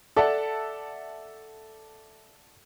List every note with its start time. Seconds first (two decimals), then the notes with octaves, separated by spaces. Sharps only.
0.16 A4 D5 E5 F#5 A5